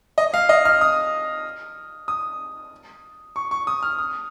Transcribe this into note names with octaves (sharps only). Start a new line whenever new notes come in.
D#5
F5
D#5
F6
D#6
D#6
C#6
C#6
D#6
F6
D#6